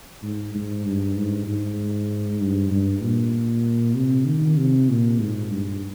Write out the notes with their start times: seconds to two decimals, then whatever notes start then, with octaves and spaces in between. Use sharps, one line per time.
0.23 G#2
0.54 G#2
0.85 G2
1.16 G#2
1.47 G#2
2.41 G2
2.71 G2
3.02 A#2
3.95 C3
4.26 D#3
4.57 C3
4.89 A#2
5.20 G#2
5.50 G2